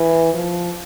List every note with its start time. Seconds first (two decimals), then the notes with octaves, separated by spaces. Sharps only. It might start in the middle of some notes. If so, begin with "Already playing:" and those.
Already playing: E3
0.34 F3